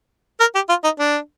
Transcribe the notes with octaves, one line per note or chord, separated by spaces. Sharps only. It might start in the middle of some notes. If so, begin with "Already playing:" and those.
A#4
G4
F4
D#4
D4